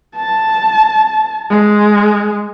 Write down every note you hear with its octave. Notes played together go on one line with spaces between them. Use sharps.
A5
G#3